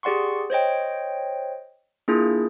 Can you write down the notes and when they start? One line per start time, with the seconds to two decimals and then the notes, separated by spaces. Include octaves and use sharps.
0.03 G4 G#4 D5 F#5 C6 C#6
0.50 C5 C#5 D#5 G5
2.08 A#3 D4 E4 F4 G#4